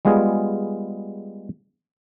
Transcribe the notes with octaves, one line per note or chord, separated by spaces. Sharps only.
G3 G#3 B3 F4 G#4